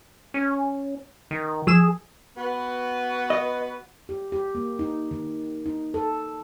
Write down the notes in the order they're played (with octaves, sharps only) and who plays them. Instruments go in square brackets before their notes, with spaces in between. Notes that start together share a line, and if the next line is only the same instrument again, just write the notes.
[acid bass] C#4
D#3
[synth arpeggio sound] F3 E6 E7 [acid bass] G#4
[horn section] B3 F#4 B4
[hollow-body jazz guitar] D#5
[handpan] G4
G4
A#3
D#4
D#3
D#4
A4